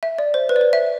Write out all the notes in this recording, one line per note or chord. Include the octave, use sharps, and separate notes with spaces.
E5
D5
C5
B4
D5
C5
E5